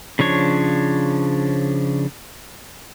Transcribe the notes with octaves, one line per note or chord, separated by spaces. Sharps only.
C#3 F3 D4 C#5